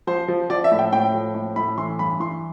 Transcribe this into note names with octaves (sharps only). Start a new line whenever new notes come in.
F3 C5
F3
F3 D5
E5
A2
G5
A2 G5
F3
A2
A2 B5
E3 C6
G2 B5
E3 C6